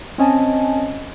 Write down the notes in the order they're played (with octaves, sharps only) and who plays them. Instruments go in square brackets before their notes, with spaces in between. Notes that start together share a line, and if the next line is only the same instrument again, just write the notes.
[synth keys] C4 C#4 D#5 G#5 A5